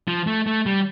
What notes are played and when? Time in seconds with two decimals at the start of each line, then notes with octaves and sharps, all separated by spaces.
0.08 F3
0.27 A3
0.47 A3
0.66 G3